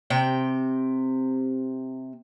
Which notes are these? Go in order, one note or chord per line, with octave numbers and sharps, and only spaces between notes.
C3 C4 G5